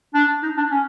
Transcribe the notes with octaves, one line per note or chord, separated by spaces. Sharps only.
D4
D#4
D4
C#4